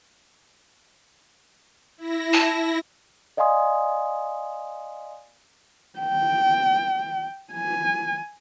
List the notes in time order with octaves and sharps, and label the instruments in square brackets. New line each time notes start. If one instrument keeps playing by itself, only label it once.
[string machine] E4 A#6
[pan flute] A5
[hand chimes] D5 D#5 F5 G#5 C6 D#6
[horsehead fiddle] G5
G#5